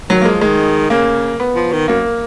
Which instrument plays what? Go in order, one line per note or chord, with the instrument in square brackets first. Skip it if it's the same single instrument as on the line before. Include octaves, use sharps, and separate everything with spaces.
[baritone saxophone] D#3 [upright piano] F#3
[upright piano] A#3
[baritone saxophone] F3 [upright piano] G#3
[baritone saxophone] D#3 [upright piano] G#3
[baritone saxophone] C#3 [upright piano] A#3
[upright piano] B3
[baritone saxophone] F3
D#3
[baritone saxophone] F#2 [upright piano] A#3